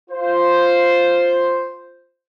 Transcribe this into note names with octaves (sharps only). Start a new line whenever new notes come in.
F4 C5